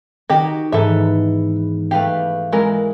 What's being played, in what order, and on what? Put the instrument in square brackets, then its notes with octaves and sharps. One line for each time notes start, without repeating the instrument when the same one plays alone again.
[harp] D#3 [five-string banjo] F#4 G4 D#5
[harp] G#2 E3 B3 [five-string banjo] A4 E5
[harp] A3 B4 F5 [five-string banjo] G4
[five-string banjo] E3 G#3 A#4